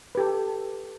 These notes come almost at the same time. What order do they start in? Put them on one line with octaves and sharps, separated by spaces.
B4 G4 A4